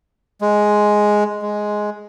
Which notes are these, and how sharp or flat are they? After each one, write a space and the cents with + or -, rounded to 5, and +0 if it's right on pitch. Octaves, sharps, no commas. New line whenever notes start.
G#3 +5
G#3 +5